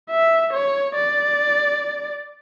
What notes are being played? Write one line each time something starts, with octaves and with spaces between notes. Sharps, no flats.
E5
C#5
D5